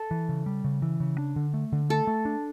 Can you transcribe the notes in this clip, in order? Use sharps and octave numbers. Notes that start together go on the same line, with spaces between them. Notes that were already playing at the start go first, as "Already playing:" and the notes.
Already playing: A4
E3
C#3
G3
C#3
E3
C#3
D4
D3
A3
D3
A3 A4
A3
D4